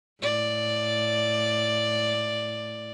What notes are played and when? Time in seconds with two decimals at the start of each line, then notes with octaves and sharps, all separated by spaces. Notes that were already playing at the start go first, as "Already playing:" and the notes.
0.21 A2 D5